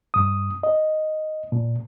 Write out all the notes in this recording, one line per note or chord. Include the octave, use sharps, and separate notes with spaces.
G2 D#6
D#5
A#2